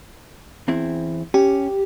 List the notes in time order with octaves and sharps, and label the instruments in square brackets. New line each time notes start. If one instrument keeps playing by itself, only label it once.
[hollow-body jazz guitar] E2 C4 E4
[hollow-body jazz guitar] C#4 [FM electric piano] G4